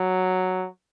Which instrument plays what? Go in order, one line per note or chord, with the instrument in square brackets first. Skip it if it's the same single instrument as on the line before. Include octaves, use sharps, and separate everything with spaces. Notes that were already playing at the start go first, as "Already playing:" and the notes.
Already playing: [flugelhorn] F#3